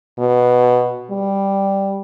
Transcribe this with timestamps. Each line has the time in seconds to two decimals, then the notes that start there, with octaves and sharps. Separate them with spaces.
0.19 B2
1.11 G3